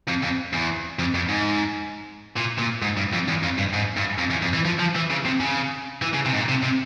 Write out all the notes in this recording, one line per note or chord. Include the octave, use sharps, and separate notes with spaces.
F2
F2
E2
F2
F2
G#2
A#2
A#2
G#2
G2
F2
E2
F2
G2
G#2
G2
F2
E2
F2
E3
F3
F3
E3
C#3
C3
C#3
E3
C#3
C3
G#2
A#2
C3
C3